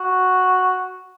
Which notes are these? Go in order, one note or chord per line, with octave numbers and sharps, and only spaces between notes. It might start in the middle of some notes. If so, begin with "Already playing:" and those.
Already playing: F#4